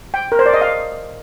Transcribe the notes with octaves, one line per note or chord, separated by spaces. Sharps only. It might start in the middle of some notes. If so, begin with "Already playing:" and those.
G5
A#4
C5
D5
D#5
F5